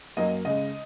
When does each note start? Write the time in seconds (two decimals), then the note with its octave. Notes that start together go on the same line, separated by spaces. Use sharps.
0.17 F#2 F#3 A#3 D#5
0.45 C#3 G#3 D#5